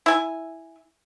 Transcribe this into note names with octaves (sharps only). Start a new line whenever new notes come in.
E4 G#5